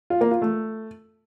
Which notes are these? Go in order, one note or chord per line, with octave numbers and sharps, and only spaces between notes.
F4
A#3
F4
A3